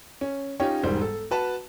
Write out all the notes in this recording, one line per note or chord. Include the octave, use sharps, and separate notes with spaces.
C#4
C#4 D#4 F4 G4 C#5
E1 G#2 G3 C5
A4
F#4 B4 A5